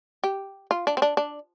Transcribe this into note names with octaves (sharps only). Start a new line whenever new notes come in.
G4
F4
D4
C4
D4
D4